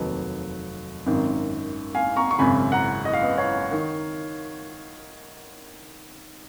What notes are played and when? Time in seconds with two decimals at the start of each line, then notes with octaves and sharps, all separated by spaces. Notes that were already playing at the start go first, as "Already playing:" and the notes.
Already playing: F1 D#2 D#3 F#3 B4 D#5
1.06 G#1 F#2 D#3
1.95 F5 G#5
2.16 A#5 C#6
2.31 C#6
2.39 G#1 F#2 C#3 G#5 B5
2.72 F#5 A#5
3.05 D#5
3.13 F5
3.23 B4 D#5
3.38 C#5 F5
3.72 D#3